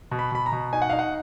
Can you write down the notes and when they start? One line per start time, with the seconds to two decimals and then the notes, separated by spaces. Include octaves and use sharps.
0.11 B2
0.19 B5
0.32 B2 B5
0.46 A#5
0.53 B2
0.73 D#4 G#5
0.82 F#5
0.90 D#4 F5
0.99 F#5